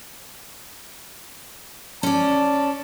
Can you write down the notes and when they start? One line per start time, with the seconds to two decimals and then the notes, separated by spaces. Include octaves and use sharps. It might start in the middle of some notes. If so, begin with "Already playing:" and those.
2.03 C#4 D5 A5